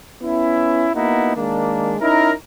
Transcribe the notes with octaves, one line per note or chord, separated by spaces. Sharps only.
B3 C#4 E4
A#3 B3 D#4 E4 F#4
D#3 G#3 A#3 D4
C#4 D#4 E4 A#4